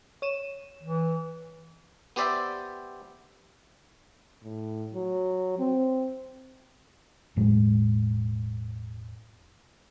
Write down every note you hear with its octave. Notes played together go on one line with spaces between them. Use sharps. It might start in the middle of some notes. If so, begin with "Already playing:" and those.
C#5 D#7 E7
E3
B3 G4 C5 D5 E5 G5
A2
F#3
C4
E1 A2 F#3 G#3